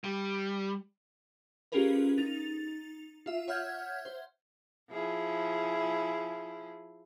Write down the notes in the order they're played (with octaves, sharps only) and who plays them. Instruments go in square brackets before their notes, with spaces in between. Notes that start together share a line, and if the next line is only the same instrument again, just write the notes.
[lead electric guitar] G3
[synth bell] C#4 F4 G4 G#4 A#4 B4
D#4 A6 F7
F4 E5
C#5 E5 F#5 F6 G6 G#6
C5
[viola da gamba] F3 E4 G#4